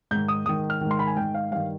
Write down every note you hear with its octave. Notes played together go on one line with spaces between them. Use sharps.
G#2 D#3 G6
D#6
G#2 D#3 D#6
F6
G#2 D#3
C6
B5
G#5
G#2 D#3 G5
F5
G2 D#3 F5